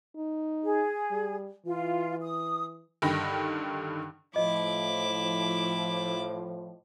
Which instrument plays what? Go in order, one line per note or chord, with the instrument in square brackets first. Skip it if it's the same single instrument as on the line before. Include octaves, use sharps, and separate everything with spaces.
[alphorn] D#4
[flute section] G#4
[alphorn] G3
[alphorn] E3 [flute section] F4
[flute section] D#6
[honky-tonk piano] G2 D3 D#3 G5 B5 A#6
[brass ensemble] A2 F3 [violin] E4 D6 [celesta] D#5